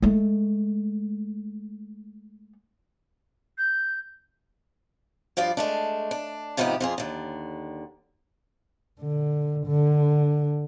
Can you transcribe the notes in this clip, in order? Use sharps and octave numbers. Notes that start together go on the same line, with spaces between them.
G#3 A3
G6
G2 F3 F4 D5
G#3 A3 D4
D4
G#2 C3 F3 B3 D#4 G4
F2 F4 G#4
D#2 D3
D3
D3